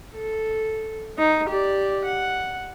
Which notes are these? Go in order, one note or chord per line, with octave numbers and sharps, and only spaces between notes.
A4
D#4
G4 D5
F#5